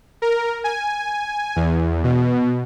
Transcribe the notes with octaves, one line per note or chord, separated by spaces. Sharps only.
A#4
G#5
E2
B2